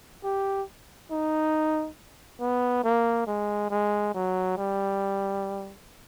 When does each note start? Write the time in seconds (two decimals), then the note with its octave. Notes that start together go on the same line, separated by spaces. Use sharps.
0.24 G4
1.11 D#4
2.41 B3
2.84 A#3
3.27 G#3
3.71 G#3
4.14 F#3
4.57 G3